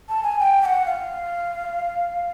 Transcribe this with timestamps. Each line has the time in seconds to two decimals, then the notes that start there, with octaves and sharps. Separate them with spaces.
0.09 A5
0.23 G#5
0.39 G5
0.62 G5
0.66 F#5
0.86 F5